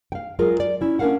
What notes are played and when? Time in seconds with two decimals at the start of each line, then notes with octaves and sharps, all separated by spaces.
0.12 F5 G5
0.39 F#3 G#3 F4 G#4 A#4
0.60 D5
0.81 C#4 E4
0.99 C#4 D4 E4 A#4 F5 F#5